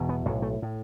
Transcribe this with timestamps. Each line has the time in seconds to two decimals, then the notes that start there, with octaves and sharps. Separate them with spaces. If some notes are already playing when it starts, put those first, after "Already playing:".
Already playing: E1 E2 B2
0.09 B3
0.26 B1 F#3
0.29 A2
0.42 A3
0.62 A2